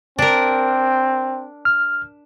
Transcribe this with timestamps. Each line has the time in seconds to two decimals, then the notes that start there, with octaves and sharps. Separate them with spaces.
0.19 C4 D4 A#4
1.65 F6